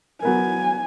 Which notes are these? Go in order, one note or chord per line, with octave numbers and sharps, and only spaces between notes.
F#3 B3 A#4 G#5